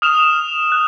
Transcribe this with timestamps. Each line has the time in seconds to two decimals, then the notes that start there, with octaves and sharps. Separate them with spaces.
0.02 D#6 F6 E7 F7
0.72 F#6